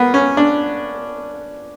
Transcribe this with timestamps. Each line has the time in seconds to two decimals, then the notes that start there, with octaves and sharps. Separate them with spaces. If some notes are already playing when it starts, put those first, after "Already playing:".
Already playing: A#3 B3
0.14 C#4
0.37 D4